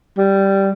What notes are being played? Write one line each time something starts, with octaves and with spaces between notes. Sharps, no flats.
G3